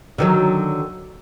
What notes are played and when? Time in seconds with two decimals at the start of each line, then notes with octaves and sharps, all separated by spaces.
0.18 D3 D#3 F#3